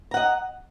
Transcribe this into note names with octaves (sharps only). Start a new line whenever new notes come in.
D#5 F#5 A#5